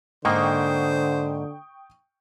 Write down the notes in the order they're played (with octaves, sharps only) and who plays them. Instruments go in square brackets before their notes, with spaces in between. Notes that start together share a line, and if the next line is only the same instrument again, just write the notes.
[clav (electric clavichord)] G#2 A#3 [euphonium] D3 [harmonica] C5 [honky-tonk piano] G5 C#6 D#6